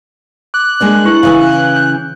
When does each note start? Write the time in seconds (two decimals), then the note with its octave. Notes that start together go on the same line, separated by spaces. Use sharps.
0.54 D6 F#6
0.80 G#3 A#3 D4
1.05 E4 B4 C#6
1.23 C#3 E3 C#4 F5 D#6
1.76 G6